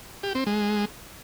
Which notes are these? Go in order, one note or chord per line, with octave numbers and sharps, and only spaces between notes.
G4
C4
G#3